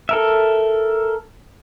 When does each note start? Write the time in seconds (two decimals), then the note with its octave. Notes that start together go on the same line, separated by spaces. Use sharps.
0.09 A4 A#4 E5